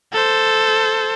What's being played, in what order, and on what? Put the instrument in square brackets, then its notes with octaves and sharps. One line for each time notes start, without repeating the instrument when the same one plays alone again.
[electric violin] A4 C5